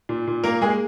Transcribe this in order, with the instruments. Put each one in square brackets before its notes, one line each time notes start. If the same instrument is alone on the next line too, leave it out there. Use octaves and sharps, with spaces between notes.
[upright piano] A#2
A#2
A#3 A#4
G#3 A#3 G#4